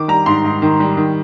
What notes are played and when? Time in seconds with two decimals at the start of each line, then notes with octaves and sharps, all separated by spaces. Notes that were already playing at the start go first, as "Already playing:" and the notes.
Already playing: D#3 D6
0.08 G3 A#5
0.26 G#2 C6
0.44 G#2
0.62 D#3
0.80 G3
0.97 D#3